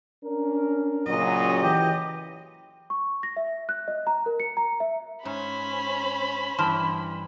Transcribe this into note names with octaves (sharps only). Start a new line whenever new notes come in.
C#4 D4 A#4
A#2 C#3 F#3 D#5
E3 G4
C#6
A#6
E5
F#6
D#5
A#5
A#4
C#7
A#5
E5
G#2 C#4 C5 B5
G2 E3 A5 C6 F6